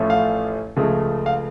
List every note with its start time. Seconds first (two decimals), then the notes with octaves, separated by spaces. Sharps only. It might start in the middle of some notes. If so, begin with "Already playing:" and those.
Already playing: A1 A2 F3 A3 C#4
0.10 F5
0.77 C#2 C#3 F3 A3
1.26 F5